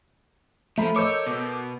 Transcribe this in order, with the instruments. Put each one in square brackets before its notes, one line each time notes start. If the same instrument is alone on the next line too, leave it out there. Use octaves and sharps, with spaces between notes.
[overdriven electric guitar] F3 [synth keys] A3 [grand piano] E5 A#5 B5
[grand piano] A4 A#4 D#5 [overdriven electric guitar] C#5 [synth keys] D6 E6 G6
[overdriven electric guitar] B2